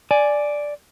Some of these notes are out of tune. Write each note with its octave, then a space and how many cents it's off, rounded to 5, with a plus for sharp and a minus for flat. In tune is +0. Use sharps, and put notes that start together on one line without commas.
D5 +0 G#5 +5